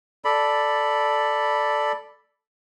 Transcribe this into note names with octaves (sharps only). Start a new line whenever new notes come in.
A4 D5 B5